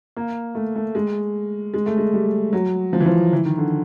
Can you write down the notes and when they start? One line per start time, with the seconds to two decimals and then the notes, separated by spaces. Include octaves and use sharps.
0.17 A#3
0.55 A3
0.76 A3
0.95 G#3
1.74 G#3
1.86 A3
1.98 G#3
2.13 G3
2.53 F#3
2.93 F3
3.00 E3
3.06 F3
3.33 E3
3.45 D#3
3.58 D3